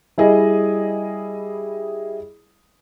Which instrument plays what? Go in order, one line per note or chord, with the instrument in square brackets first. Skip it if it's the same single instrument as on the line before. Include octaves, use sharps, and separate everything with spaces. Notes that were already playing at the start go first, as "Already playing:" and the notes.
[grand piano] G3 E4 G#4 D#5